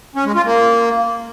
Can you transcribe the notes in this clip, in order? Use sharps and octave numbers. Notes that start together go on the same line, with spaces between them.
C#4
G#3
F4
A#3